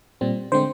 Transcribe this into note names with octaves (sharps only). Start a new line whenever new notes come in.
A#2 G3 C4
D3 G#3 C4 C5